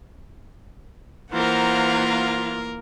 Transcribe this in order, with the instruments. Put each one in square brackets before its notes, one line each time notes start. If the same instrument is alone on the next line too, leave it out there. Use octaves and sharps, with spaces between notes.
[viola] E3 F4 [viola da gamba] A#3 A#4 [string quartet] C5 F#5 A#5